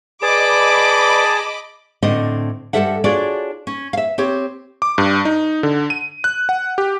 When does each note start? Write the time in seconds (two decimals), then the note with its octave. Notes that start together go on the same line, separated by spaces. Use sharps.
0.22 G#4 B4 D5 D#5 A5 B5 D6
2.02 A2 D3 C4 D4 D#5
2.73 G2 C#3 G3 A4 E5 F#5
3.04 D4 F4 F#4 G#4 C#5 D5
3.67 C#4
3.93 E5 F5
4.18 C4 G4 C#5
4.82 D6
4.98 G2
5.25 D#4
5.63 D3
5.90 D#7
6.24 F#6
6.49 F#5
6.78 G4